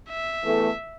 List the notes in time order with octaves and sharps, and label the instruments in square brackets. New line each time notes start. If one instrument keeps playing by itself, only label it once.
[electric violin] E5
[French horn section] E2 E3 A3